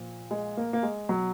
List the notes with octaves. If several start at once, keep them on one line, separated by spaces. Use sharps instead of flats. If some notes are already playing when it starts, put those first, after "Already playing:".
Already playing: A#2 F3
G#3
A#3
A#3
G#3
B2 F#3